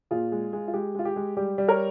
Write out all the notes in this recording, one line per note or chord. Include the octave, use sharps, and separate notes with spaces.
A#2 F4 G#4
G#3
G#3
F4
G#3 G4
G#3 F4
G4
G#3
G3 G4
G3
A#4 C#5